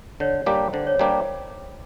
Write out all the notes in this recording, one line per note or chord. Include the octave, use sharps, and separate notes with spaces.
D3 C#5
G3 A#3 D4 G4
D3 C5
C#5
G3 A#3 D4 G4 D5